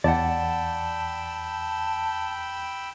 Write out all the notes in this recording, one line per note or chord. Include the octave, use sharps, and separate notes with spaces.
E2 D5 F#5 G5 A5 B5 E6